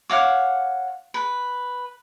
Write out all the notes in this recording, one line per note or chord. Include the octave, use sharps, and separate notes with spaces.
C#5 F5 F#5 D6
B4